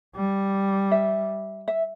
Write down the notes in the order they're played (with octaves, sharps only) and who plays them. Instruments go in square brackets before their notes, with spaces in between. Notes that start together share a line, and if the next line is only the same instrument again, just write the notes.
[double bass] G3
[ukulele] E5
E5